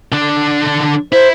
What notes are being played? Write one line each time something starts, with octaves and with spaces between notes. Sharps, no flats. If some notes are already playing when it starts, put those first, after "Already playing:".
D3 D4
E4 C5